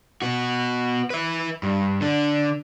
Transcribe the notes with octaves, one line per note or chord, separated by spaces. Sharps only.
B3 F#4
B4 E5
G2
D3 D4